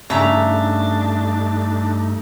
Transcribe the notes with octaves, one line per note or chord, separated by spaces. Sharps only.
G2 C#3 A3 D4 D#4 E5 A#5